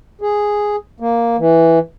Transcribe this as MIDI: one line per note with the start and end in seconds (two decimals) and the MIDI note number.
0.21 0.76 68
1.00 1.36 58
1.38 1.79 52